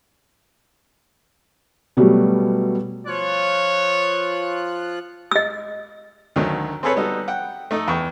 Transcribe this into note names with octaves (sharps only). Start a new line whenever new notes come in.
B2 F#3 G3 A3 B3
F3 F4 C#5 F#6
D#5 E6
D2 D#3 F#3 A3
C4 G#4 A4 B4 C#5
G3 B3 D#4 F#4 A4
F#5 G5
A3 D#4 A4
E2 G5 C#6